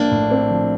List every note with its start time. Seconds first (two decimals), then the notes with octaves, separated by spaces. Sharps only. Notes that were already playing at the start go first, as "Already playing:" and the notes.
Already playing: A#1 A#3 D4
0.11 A2
0.31 C4
0.51 F3